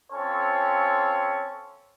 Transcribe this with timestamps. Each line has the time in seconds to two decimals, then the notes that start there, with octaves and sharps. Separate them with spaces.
0.12 C4 C#4 F4 A4 C#5